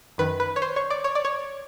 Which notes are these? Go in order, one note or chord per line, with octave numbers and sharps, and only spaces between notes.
F#2 D#3 B4
B4
C#5
C5
C#5
D5
C#5
D5
C#5